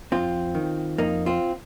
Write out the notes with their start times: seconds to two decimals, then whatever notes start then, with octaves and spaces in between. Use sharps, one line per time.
0.12 F2 C4 F4
0.55 D#3
0.98 F2 A#3 D#4
1.26 C4 F4